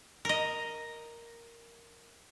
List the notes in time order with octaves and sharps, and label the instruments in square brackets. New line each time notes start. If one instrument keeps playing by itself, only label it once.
[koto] A#4 D#5